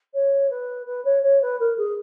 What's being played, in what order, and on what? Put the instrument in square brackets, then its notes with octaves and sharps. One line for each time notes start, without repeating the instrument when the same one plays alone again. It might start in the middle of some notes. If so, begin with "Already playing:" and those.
[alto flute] C#5
B4
B4
C#5
C#5
B4
A#4
G#4